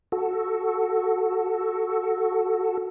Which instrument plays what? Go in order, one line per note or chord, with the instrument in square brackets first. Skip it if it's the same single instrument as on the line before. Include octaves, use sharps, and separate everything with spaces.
[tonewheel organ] F#4 A4